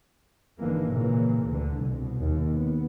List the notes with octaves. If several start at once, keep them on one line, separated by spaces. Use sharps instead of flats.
G#1 G#2 D3 E3 A#3
A#2 C#3 E3 A#3
D2 D3
C2 B2
D#2
B3